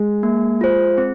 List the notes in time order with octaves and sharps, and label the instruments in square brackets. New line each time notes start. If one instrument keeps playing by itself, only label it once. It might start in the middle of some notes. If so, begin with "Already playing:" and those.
Already playing: [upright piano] G#3
[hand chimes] A#3
F4 C5
C4